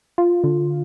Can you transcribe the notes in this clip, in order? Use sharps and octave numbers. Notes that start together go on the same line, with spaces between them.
F4
D3